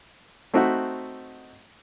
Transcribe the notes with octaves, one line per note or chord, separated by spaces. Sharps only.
A3 C4 D#4 F#4 E5 F#5